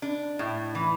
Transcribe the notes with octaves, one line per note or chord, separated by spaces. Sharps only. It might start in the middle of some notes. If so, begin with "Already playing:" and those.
D4
A2
E3